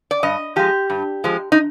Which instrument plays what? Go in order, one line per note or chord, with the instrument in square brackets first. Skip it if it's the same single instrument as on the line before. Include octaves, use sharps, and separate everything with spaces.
[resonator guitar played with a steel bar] D5
G2 D#5
F3 G#3 G4
G2
F3 G#3
D#4